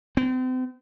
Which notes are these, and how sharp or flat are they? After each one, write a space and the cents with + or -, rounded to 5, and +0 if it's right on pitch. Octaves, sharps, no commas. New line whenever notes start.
C4 -40